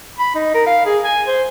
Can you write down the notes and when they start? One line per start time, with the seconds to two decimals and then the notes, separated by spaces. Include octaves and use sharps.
0.19 B5
0.35 D#4
0.54 A#4
0.67 F5
0.86 G#4
1.04 G#5
1.27 C5